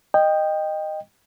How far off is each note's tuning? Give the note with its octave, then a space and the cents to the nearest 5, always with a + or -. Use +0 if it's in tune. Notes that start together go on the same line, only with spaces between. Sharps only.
D#5 -10 G5 +10